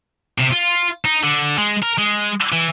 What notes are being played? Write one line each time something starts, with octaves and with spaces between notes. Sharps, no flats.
C3
F4
D#4
D3
G#3
A#4
G#3
E3